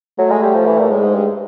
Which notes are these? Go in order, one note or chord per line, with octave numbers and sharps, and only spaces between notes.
F#3 A3
G#3
G3
F3
E3
A#2
A2 G#3
G#2
G2